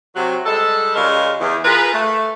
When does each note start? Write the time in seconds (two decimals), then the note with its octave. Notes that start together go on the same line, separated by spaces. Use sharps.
0.16 C3 F#3
0.46 G3 G#3 A4
0.96 C#3 G3 G#3 F4 A#4
1.40 E2
1.65 F4 G#4 A#4 B4
1.93 A3